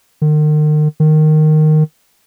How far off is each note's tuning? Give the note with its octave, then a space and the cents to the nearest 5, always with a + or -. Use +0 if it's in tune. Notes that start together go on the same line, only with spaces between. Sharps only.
D#3 -40
D#3 -10